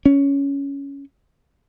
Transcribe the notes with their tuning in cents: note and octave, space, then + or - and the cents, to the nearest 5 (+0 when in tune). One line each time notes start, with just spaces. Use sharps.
C#4 +10